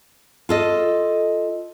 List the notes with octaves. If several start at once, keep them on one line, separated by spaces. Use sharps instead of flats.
F4 A4 D#5